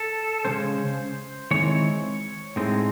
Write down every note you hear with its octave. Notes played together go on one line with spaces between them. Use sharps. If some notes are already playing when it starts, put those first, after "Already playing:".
Already playing: A4
C#3 E3 G#3 C#4 C5
D#3 G#3 C4 E4 C#5
A2 G#3 C4 D#4